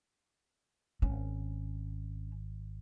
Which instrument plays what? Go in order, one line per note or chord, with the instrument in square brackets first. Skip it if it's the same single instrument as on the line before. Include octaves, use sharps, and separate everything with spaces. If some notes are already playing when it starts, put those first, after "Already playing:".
[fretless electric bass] G#1 [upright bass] C#4